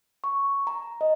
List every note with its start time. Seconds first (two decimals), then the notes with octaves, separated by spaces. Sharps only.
0.24 C#6
0.67 A#5
1.01 D#5